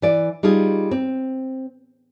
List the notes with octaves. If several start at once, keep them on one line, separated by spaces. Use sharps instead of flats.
E3 D5
G3 D#4 F4 G#4
C4